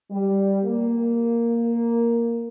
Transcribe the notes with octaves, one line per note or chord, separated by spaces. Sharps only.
G3
A#3